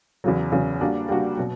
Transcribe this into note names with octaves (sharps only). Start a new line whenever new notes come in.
E2 C#3 F#3
E2 C#3 F#3
G3 A#3 D4 F#4
G3 A#3 D4 F#4
B2 F#3